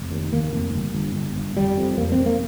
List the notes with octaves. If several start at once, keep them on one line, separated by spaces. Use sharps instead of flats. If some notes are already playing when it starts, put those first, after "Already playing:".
Already playing: F1
D#2
D#2 A#3
F1
G1
G1
G1
G1
F1 G3
F2
F2 A#3
C4
F1
A#3